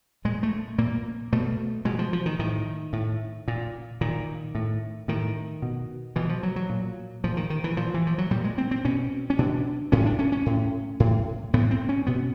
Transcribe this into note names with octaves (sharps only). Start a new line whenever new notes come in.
A#2 G#3
A3
A#2 A#3
B2 A3
B2 G#3
F3
F3
D#3
A2 D#3
A2
A#2
A#2 D#3
A2
A2 D#3
B2
B2 E3
F3
F#3
F#3
A#2
A#2 F3
D#3
D#3
E3
A#2 F3
E3
F3
F#3
A#2 G3
G#3
C4
C4
B2 C#4
C#4
B2 D4
A2 C#4
D4
C#4
C#4
A2
A2
A2 B3
C4
C#4
B2 B3